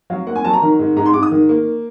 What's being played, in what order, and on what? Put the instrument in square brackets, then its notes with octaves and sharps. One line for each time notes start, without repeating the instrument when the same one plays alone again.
[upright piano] F#3 F5
A#3 F#5
G#5
F#3 A5
A#5
D#3
G#2
G#2 A#5
C6
G#2 D6
D#6
D#3
A#3